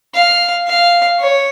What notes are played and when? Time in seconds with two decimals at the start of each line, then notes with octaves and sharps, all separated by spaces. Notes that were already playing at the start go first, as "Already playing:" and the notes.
0.14 F5
0.67 F5
1.19 C#5